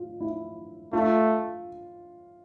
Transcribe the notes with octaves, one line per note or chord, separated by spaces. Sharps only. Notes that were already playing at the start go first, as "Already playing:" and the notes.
Already playing: F4
E4
A3 F4